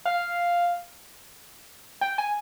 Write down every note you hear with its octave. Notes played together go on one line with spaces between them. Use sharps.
F5
G5
G#5